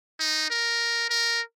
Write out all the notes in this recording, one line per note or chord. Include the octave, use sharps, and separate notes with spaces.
D#4
A#4
A#4